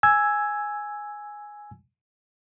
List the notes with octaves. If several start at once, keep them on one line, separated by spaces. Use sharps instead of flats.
G#5 E6 G#6